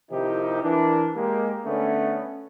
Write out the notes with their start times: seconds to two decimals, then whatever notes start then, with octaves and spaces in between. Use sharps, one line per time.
0.11 C3 D#3 F3 D#4 E4 G4
0.62 E3 D4 A#4
1.15 G#3 A#3 G4
1.65 D3 A3 B3 C#4